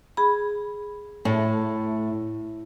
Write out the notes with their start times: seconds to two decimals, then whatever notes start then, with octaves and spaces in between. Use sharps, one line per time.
0.17 G#4 B5
1.25 A2 A3